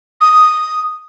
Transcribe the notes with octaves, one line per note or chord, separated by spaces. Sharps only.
D#6